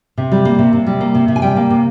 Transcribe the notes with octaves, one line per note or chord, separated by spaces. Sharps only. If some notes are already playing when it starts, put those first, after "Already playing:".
C3
G3
A#3
C3
C3
G3
A#3
C3
C3
G#5
G3 G5
A#3
C3